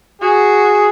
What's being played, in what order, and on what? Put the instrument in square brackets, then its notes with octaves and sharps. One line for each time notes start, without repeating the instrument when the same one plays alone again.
[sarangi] F#4 [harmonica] G#4